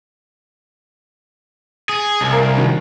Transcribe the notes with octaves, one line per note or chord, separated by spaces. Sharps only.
G#4
C2 G#5
A#4 F5
D#3 F#4